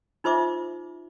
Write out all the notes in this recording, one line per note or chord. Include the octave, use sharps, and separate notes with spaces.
D#4 F4 C5 E5 D6